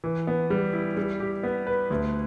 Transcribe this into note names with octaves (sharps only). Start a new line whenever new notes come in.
E3
B3
G3
E4
G3
G4
B3
B4
D2